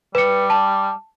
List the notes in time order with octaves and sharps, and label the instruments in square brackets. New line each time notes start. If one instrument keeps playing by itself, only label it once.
[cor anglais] G3 [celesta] B4 C#7
[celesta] A5